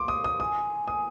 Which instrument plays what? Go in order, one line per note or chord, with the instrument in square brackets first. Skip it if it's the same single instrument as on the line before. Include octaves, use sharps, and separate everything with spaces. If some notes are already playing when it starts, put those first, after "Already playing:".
Already playing: [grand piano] C6 D6
D#6
D#6
[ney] G#5 [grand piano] D#6
[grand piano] D#6